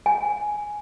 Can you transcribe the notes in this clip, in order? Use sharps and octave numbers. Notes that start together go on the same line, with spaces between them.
G#5